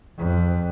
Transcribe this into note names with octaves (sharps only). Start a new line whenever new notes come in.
F2